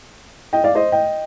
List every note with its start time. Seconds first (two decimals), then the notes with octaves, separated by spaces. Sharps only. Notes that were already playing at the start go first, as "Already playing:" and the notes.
0.53 D#5 G5
0.64 D5 F5
0.75 C5 D#5
0.92 D#5 G5